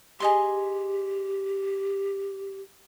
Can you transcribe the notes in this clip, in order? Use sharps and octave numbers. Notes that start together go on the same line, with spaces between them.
G4 G#4 D#5 C6